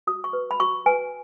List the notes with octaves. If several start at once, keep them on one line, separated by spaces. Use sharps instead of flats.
F#4 D#6
C#6
B4
B5
F#4 C#6
B4 G#5